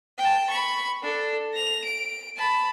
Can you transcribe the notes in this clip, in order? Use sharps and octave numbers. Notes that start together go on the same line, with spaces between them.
G5 A5
B5 C#6
D4 A4
A#6 F7
D7
A5 B5